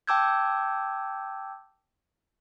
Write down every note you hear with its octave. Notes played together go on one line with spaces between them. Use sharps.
G5 A5 D6 E6 G6 G#6